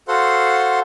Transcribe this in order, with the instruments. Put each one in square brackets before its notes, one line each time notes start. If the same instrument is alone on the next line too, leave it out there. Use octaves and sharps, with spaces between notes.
[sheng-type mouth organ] F#4 A4 C5 F5 F#5 C6